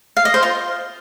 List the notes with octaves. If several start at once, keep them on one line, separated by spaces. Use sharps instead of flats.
F5
D#5
C5
F4